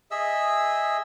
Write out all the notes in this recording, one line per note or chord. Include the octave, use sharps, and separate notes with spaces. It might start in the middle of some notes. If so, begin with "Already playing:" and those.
G#4 D#5 E5 E6